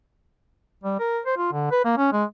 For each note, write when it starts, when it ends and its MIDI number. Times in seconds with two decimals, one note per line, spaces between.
0.84 0.96 55
0.99 1.20 70
1.25 1.37 72
1.37 1.52 65
1.52 1.67 50
1.71 1.82 71
1.85 1.97 58
1.97 2.09 61
2.13 2.24 56